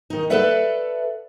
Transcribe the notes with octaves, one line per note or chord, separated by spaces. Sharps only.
D#3 D#4
A4 B4 D5 E5 F#5